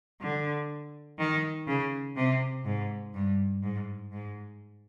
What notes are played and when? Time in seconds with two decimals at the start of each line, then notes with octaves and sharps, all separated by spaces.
0.21 D3
1.19 D#3
1.67 C#3
2.16 C3
2.65 G#2
3.14 G2
3.62 G#2
4.12 G#2